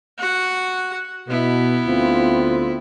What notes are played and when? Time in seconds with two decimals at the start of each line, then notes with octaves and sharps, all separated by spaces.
0.18 F#4 F#5
1.28 B2 B3 E4
1.87 D2 C4 F4